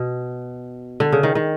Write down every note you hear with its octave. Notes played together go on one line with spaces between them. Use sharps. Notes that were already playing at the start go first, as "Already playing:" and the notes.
Already playing: B2
D3
C#3
D#3
D#3